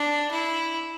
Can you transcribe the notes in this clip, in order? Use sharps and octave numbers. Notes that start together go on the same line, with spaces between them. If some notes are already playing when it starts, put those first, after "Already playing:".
Already playing: D4
E4